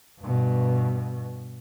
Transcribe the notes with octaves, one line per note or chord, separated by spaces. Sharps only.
G2 B2